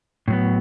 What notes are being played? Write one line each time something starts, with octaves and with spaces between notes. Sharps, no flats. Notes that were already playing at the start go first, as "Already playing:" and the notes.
A2 F#3 B3